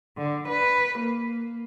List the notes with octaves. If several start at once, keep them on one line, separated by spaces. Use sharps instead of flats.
D3
B4
A#3